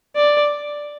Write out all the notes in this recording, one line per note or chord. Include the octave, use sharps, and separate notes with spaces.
D5